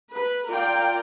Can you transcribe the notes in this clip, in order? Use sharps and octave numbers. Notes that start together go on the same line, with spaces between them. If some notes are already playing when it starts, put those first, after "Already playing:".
B4
F4 A#4 D5 G5